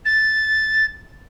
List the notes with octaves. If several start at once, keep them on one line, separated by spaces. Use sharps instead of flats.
A6